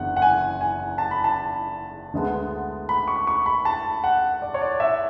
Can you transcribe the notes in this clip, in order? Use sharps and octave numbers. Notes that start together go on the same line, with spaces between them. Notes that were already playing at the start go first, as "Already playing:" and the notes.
Already playing: F#1 E2 D3 F#5
F#5
G#5
G#5
A5
B5
A5
D2 D3 G#3 B3
B5
C#6
C#6
B5
A5
F#5
D5
C#5
D5
E5